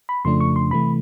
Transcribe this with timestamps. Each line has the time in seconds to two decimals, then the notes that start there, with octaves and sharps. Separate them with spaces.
0.09 B5
0.25 F2 C#3 F3 A3 D4 C6
0.40 C#6
0.56 C6
0.71 C3 E3 A3 B5